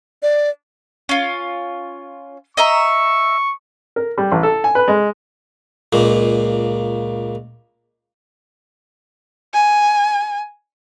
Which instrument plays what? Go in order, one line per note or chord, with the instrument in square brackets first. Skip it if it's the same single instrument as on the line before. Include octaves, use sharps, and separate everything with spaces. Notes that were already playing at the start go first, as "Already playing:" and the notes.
[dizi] D5
[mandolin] C#4 F4
[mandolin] D#5 E5 A#5 [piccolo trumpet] C#6
[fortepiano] A#4
G3
A1
A4
G#5
B4
G#3
[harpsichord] C#2 A#2 A#3
[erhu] G#5